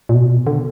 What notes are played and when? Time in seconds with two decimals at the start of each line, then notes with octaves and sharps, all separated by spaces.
0.09 A#2
0.14 B2
0.47 D3